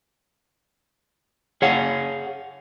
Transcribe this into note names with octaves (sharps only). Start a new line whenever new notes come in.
G#4 C#5 F5 F#5